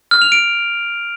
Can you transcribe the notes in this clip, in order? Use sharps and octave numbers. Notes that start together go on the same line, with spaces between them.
F6
F7
D7